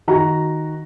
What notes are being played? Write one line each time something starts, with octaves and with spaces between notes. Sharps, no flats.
D#3 F#4 A#5